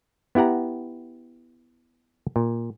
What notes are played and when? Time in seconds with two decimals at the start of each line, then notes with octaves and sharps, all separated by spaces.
0.35 B3 E4 G4 F#5 A#5
2.36 A#2